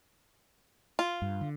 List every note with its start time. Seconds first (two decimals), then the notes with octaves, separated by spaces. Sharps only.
0.99 F4
1.22 G2
1.41 D3